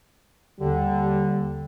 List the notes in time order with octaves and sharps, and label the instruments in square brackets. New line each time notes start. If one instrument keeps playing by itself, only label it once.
[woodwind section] D#2 D3 [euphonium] G3